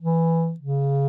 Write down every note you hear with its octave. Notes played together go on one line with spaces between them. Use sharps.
E3
C#3